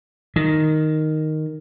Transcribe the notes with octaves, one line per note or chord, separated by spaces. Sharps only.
D#3